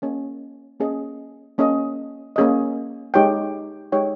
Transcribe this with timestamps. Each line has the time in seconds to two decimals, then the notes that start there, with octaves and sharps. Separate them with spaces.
0.02 A#3 C#4 G#4 D#5
0.80 A#3 C#4 G#4 D#5
1.58 A#3 C#4 G#4 D#5
2.36 A#3 C#4 G#4 D#5
3.14 G#3 D#4 G4 C#5 G5
3.92 G#3 D#4 G4 C#5 G5